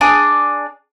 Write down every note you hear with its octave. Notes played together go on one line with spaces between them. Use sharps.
D4 G#4 D6